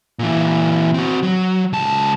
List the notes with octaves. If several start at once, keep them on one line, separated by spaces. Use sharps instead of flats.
A#2 E3
C4 F#4
F#3
C#2 A5